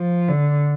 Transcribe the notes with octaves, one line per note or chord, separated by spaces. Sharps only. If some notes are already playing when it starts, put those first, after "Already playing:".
Already playing: F3
D3